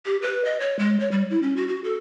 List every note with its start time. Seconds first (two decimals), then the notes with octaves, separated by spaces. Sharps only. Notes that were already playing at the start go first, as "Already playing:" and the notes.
0.06 G4
0.22 B4
0.45 D#5
0.60 C#5
0.79 G#3
1.00 C#5
1.12 G3
1.30 E4
1.42 C#4
1.56 F#4
1.68 F#4
1.84 A4